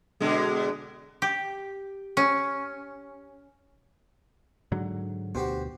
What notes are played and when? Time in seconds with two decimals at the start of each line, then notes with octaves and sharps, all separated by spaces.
0.20 B2 D3 G#3
1.22 G4
2.17 C#4
4.72 G#2 D3 F#3
5.35 D2 B2 F#4 G4 C5